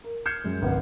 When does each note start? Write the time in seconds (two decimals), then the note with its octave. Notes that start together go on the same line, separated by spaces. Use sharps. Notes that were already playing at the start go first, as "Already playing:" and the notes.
0.04 A#4
0.26 F6 G6 G#6 C7 C#7 E7
0.44 F#2 G#3
0.62 G#1 C#2 B3 F#5